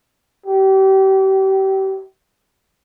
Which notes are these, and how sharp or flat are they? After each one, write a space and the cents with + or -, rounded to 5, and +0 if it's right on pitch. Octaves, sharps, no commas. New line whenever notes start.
G4 -30